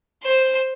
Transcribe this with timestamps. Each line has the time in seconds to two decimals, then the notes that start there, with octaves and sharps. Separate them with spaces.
0.23 C5